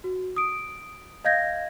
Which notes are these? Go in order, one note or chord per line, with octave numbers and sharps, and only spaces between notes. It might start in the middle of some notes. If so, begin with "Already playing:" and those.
F#4
D#6 D7
D#5 F5 G6 G#6 A#6